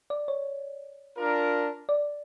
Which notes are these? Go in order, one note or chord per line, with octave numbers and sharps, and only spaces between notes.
D5
C#5
D4 F4 A#4
D5